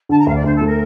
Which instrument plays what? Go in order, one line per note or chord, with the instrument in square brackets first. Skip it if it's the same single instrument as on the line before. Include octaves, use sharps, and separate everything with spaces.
[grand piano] D3 [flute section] A5
[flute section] A#5
[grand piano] D2 [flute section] F5
[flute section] D5
[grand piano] D2 [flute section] C5
[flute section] A4
[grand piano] A3
[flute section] A#4